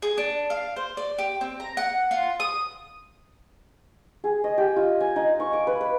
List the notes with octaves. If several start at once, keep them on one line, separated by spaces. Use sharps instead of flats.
G#4
D4
F5
C5
D5
G4
C4
A#5
F#5
F4
D#6
G#4
D#5
G4
F4
G#5
D#4
C#6
D6
B4
B4